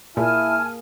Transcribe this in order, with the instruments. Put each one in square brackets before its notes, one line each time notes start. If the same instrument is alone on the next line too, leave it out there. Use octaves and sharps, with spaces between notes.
[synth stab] A#2 [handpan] A#3 G#4 [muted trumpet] E4 [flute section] G#5 A5 F6